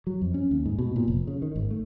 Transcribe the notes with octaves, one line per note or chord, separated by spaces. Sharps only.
F#3
F2
C#4
D#2
G#2
B2
A#2
F1
C#3
D#3
G#1
A3